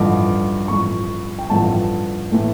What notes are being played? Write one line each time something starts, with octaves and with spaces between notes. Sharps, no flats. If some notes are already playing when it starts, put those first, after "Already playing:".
Already playing: A1 G2 F3 A3 D6
A1 G2 F3 A3 C#6
G5
A1 G2 F3 A3 A5
A2 E3 A3